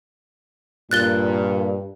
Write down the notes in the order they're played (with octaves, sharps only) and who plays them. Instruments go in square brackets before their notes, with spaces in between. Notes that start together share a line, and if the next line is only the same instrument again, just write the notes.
[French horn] G2 [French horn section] A#2 [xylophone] F#6 A6 G7